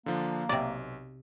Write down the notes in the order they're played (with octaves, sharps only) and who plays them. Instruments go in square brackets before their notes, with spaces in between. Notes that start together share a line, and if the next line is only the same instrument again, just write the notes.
[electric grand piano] D3 F3 D4 [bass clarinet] A#3
[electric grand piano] B1 [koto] C3 D5